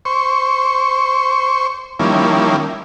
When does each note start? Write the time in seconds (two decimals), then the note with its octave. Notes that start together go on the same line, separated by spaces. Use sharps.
0.05 C5 C#6
2.00 D#3 F3 G3 A#3 C#4 E4